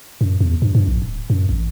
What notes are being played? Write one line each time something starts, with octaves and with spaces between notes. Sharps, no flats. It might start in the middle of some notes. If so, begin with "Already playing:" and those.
F#2
E2
G2
G2
A#1
D1
F#2
A1